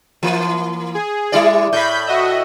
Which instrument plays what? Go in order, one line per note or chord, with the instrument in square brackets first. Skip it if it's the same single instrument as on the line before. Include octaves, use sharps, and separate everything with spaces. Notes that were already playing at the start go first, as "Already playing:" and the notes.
[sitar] E3 A#3
[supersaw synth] G#4
[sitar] G3 E4 D5
[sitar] A2 [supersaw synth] B5 G6
[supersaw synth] F#4 D#5 E5